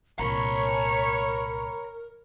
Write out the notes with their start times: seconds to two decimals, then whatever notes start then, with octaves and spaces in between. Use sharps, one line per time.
0.19 C2 A#2 A#4 C#5 A#5 B5